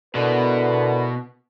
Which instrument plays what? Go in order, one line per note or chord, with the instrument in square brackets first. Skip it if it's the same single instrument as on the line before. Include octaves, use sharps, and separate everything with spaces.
[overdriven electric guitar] B2 [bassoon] D3 [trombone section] E4 A#4 B4